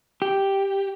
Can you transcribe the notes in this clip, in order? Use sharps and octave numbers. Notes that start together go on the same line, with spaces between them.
G4